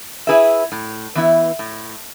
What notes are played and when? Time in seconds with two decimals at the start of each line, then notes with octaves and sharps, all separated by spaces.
0.27 E4 G#4 B4 E5
0.72 A2
1.15 E3 B3 E4
1.59 A2